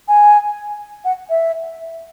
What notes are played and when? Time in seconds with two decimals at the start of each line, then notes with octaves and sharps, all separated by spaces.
0.08 G#5
1.05 F#5
1.30 E5